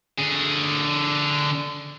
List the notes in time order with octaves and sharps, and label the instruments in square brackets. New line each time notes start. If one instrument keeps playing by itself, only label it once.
[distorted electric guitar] D3 G#4